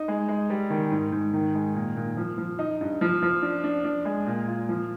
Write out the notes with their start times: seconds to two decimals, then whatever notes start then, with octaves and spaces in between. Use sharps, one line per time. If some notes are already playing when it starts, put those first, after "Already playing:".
Already playing: D#4
0.08 G#3
0.28 G#3
0.50 G3
0.70 D#3
0.92 G#2
1.12 G#2
1.34 D#3
1.55 G#3
1.75 A#2
1.96 A#2
2.17 F3
2.38 F3
2.59 D#4
2.81 G2
3.01 F3
3.22 F3
3.42 D4
3.64 D4
3.85 D4
4.05 G#3
4.26 A#2
4.48 F4
4.69 F3